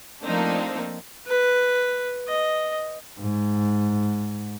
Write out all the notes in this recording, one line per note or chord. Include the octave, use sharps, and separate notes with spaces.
F3 A3 A#3 C4 D4 D#4
B4
D#5
G#2